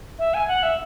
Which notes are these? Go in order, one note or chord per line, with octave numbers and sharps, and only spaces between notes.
E5
G#5
F#5
E5